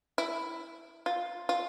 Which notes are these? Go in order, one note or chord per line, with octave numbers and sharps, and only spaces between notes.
E4
F4
F4